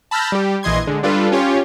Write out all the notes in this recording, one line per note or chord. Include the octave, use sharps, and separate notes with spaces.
A5 B5 E6 F6 G6 A#6
G3 G4
A#1 E3 D#5 C6 G#6
D3 G#3
G3 D4 F4 A4 B4
C#4 F4 G4 C#5